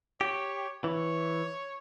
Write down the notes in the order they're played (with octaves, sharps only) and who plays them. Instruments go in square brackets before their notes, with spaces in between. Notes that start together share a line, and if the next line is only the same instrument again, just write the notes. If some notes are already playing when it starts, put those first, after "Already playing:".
[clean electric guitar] G4 [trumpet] C#5
[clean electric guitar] E3 [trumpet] C#5